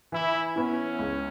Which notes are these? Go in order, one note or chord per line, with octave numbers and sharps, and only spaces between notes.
E3 E4
B3 C#4 E4
C#2